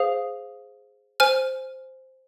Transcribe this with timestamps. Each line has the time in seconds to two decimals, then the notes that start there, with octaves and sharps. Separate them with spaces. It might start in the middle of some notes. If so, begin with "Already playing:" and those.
Already playing: G#4 C5 F5 D#6
1.20 C5 G#5 F6